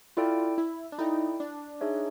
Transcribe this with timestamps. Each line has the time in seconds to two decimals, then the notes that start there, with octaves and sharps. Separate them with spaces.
0.17 E4 F4 A4 D5 G5
0.58 E4
0.92 D4
0.99 D#4 E4 A4 D5 G5
1.40 D4
1.81 D#4 G#4 C#5 E5